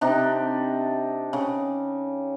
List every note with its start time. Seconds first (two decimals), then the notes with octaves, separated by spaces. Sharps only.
0.01 C3 D4 D#4 G4
1.33 C#3